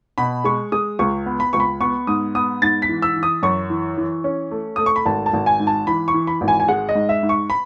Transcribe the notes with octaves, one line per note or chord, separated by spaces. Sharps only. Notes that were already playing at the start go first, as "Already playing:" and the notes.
B2 B5
G#3 C#6
G#3 D#6
C#2 C#6
B3
B5
C#2 C#6
B5
B3 C#6
G#2 D#6
B3 D#6
G#2 A6
B6
E3
E6
E3
D#6
F#2 C#6
E3
E3
C#4
A3
A3 D#6
C#6
B5
G#1 A5
A5
G#1
G#5
G#2
A5
E3 B5
C#6
E3
B5
G#1
G#5
G#5
G#3 F#5
D#5
G#2
E5
G#2
C#6
B5